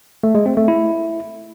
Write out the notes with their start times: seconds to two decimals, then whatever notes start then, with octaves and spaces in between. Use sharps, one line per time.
0.23 A3
0.35 G#3
0.46 C4
0.57 A3
0.68 E4